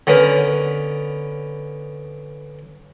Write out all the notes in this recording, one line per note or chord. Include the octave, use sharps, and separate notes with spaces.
D3 B3 C#4 A#4 B4